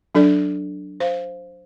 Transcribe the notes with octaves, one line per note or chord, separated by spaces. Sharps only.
F#3 D4 A4 D5
C5 F5